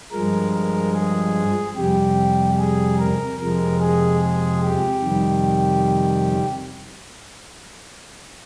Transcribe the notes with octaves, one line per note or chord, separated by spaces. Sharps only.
G2 F3 G#3 A#4
A#4
G#4
F2 C3 G3 G4
G#4
A#4
F2 C3 F3 G#3 A#4
G#4
G#4
G4
F2 C3 D#3 G3